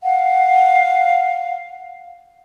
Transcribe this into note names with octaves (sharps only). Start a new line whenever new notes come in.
F5 F#5